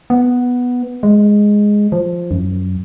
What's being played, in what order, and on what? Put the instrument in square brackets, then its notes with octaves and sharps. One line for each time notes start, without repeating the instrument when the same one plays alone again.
[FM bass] B3
G#3
F3
F#2